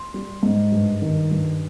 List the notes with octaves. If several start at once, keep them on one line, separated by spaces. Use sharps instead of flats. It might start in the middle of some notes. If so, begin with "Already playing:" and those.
Already playing: C6
G3
G#2
G2
D#3
G2